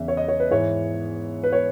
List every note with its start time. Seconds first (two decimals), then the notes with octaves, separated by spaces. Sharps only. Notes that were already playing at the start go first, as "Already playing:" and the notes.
Already playing: E2 C#3 E5
0.08 C#5
0.17 D#5
0.28 C#5
0.40 B4
0.51 G#2 E3 G#3 C#5
1.44 B4
1.53 C#5